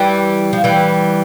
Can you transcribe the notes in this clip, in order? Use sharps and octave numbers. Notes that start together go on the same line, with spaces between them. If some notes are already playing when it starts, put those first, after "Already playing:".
Already playing: E3 G3
F3
E3 G3